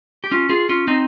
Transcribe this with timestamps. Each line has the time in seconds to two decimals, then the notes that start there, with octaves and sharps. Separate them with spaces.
0.24 G4
0.31 C#4 F4
0.49 F4 G#4
0.69 C#4 F4
0.88 C4 D#4